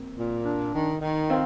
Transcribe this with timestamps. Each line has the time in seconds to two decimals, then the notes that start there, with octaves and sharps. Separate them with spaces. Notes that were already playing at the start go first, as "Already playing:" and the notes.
Already playing: A#3 C4
0.18 A#2
0.45 D4
0.74 D#3
1.01 D#3
1.30 C4 F4